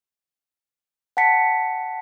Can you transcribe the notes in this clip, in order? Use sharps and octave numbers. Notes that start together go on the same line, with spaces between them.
F#5 G5 A5 B6 C#7